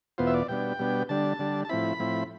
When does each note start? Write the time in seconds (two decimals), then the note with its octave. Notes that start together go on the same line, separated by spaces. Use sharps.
0.18 E2 B2 B3 F4 C5
0.27 E5
0.34 D5
0.49 B2 G3 B3 D4 G5
0.79 B2 G3 B3 D4
1.09 D3 G3 D4 A5
1.39 D3 G3 D4
1.65 A5
1.69 A2 F3 C4 E4 B5
2.00 A2 F3 C4 E4